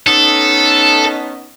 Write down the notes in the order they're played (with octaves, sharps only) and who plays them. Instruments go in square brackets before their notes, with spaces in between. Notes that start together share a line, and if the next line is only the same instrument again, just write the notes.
[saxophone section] B3 C#4 D#4 [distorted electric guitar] A4